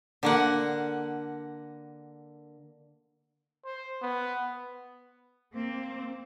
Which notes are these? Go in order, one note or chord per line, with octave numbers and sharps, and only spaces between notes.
D3 A#3 F#5
C5
B3
A#3 C4